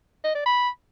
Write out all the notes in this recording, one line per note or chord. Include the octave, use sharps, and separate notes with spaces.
D#5
D5
B5